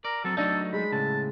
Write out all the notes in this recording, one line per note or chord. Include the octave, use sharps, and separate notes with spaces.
A#4 D5
F#3 C4 A4
F#3 A3 D4 D#4 A4 D5
G#3 B5
A2 C#3 A5